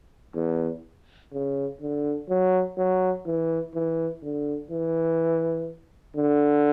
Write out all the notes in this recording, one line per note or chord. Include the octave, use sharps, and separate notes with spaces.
E2
C#3
D3
F#3
F#3
E3
E3
D3
E3
D3